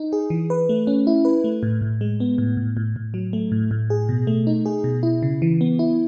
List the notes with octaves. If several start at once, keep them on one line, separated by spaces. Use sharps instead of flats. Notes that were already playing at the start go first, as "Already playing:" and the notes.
Already playing: D#4
G#4
E3
B4
A3
C#4
E4
B4
A3
A2
A2
G#3
B3
A2
A2
A2
A2
F#3
A3
A2
A2
G#4
B2
A3
D#4
G#4
B2
E4
C#3
E3
B3
E4